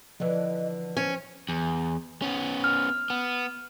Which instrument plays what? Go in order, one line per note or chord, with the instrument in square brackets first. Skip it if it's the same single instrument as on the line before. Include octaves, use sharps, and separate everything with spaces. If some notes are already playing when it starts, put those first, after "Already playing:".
[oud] D3 E3 [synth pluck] F3 [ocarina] D#5
[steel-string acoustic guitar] C#4 [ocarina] C5
[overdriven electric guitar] E2
B3 C#4
[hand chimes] F6
[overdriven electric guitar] B3